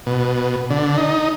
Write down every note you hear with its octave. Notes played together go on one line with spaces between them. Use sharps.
B2
D3
D#4